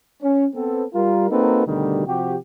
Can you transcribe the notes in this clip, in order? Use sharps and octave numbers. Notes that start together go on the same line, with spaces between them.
C#4
B3 C4 A4
G3 F4 A#4
A#3 C4 D#4 F#4 A4 B4
D2 B2 D3 D#3 G3
C3 F3 F#4 G4